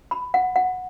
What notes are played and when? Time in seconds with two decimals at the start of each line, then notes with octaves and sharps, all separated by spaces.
0.11 B5
0.34 F#5
0.56 F#5